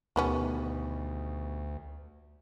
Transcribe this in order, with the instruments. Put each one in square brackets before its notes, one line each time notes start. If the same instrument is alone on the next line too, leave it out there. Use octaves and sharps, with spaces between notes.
[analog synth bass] D2 [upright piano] B2 D#3 G4 [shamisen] A3 B3 C#4